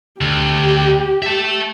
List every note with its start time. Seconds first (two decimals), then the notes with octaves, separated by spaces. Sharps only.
0.21 D2 G4
1.22 E5 A5